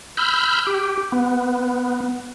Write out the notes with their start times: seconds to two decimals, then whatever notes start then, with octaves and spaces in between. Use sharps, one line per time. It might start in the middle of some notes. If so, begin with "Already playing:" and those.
0.17 B5 E6 F6 G6
0.67 G4
1.12 B3